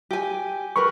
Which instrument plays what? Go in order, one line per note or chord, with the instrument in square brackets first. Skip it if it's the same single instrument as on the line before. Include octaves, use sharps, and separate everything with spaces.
[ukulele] G4 G#5
[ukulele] A#4 B4 B5 [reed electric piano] C#6